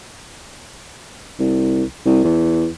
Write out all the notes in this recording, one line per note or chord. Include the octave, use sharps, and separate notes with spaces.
C2
C2
E2